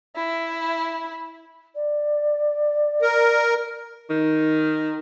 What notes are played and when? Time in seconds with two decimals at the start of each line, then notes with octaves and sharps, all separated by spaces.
0.16 E4
1.75 D5
3.02 A#4
4.10 D#3